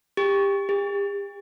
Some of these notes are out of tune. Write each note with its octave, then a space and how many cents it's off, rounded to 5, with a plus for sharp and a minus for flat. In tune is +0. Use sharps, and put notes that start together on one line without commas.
G4 +20
G4 +40